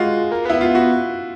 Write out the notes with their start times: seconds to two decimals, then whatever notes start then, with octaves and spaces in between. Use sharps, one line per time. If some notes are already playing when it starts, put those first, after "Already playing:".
Already playing: G#3 F4 F#4
0.32 A#3
0.45 B3 E4
0.61 F4
0.75 F#4